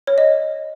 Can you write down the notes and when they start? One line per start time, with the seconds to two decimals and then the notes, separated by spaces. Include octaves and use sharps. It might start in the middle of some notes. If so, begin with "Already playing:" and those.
0.07 C#5
0.18 D#5